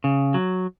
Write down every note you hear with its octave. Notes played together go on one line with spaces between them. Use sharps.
C#3
F#3